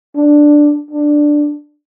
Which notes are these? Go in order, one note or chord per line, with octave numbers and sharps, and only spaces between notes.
D4
D4